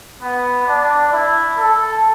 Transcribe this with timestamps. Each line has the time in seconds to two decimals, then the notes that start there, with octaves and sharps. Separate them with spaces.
0.21 B3
0.67 D4
1.11 E4
1.56 A4